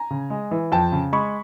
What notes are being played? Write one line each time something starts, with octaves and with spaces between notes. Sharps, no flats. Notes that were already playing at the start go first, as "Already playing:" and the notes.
Already playing: G#5 A#5
C#3
G#3
E3
F2 G5 A5
C#3
G#3 B5 C#6